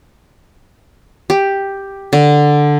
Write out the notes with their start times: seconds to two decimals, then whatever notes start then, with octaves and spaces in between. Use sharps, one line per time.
1.30 G4
2.13 D3